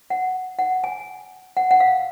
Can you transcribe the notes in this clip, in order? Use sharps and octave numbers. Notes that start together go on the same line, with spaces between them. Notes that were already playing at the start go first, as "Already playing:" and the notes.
F#5
F#5
G#5
F#5
F#5
F5